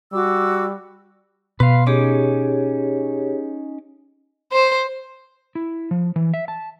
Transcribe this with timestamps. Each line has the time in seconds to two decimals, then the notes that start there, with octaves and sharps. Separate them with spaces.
0.13 G3 F#4 D6 E6
1.60 B2 B4 F5 C6
1.87 C#4 D#4 G4 G#4 C#5 D6
4.53 C5
5.55 E4
5.91 F3
6.16 E3
6.34 E5
6.48 A5